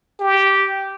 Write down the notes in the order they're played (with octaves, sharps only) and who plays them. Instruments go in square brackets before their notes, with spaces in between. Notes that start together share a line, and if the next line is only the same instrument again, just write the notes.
[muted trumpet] G4